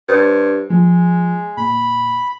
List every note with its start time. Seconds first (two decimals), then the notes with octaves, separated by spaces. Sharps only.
0.09 G2 C5
0.70 F3 G#3
1.57 A#2 B5